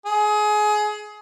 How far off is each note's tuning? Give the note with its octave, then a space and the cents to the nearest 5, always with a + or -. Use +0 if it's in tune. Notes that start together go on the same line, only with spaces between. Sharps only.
G#4 +25